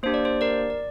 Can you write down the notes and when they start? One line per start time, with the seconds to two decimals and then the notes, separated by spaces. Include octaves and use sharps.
0.03 A#3 D4 G4 C5
0.14 D5
0.25 C5
0.41 A#4 D5
0.70 D5